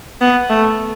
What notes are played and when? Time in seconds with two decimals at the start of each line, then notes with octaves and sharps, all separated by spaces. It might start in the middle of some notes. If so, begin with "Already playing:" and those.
0.21 B3
0.50 A3